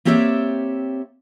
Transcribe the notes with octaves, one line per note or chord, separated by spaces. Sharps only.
A#3 C4 G4 C#5 D5 E5